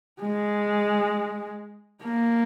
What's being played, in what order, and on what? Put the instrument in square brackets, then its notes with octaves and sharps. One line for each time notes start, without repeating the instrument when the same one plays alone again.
[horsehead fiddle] G#3
A#3